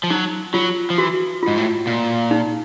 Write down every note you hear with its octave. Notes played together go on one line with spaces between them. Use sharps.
F3
F#3 D#4
F#3 F4
F3
E3 F#4
F4
G#2
A2
A#2
D#4